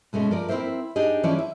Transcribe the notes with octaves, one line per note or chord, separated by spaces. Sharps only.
B2 G#3 A3 C#4
F3 A#4 D5
C4 E4 G4 A#4 C5 E5
D4 D#4 G4 G#4 D#5
E3 F3 C#4 E4 C#5 D5
E5